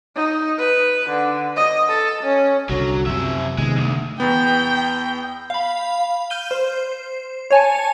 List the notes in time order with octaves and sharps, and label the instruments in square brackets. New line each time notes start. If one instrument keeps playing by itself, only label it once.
[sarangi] D#4
B4
D3
D#5
A4
C#4
[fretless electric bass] C2 D3 [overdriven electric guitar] F#3
[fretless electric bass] F#2 C3 [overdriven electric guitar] F3 E5
[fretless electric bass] C3 D#3 B3 [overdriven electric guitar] G#3
[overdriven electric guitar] D2 G2
[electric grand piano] E2 B3 [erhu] G5
[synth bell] F5 B5
F6 G6 D#7 G7
C5
C#5 G#5 A5